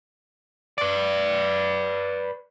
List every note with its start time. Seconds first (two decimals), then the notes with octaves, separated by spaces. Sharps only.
0.78 B4 D5